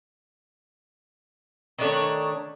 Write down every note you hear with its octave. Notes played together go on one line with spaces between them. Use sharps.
D#3 A3 D4 C#5